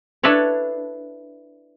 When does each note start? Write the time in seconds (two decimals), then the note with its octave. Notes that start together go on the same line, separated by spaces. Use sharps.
0.23 D4 E4 A4 B4 C#5